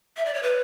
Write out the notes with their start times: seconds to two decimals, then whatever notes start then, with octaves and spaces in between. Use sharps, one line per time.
0.17 E5
0.25 D5
0.34 C#5
0.43 B4